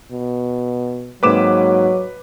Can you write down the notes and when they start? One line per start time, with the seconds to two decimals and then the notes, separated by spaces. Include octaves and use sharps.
0.12 B2
1.23 G#2 F#3 A#3 C4 B4 D6 E7